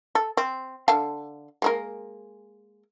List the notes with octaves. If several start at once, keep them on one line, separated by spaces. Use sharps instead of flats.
A4
C4
D3 F5 A5
G#3 A#3 A#4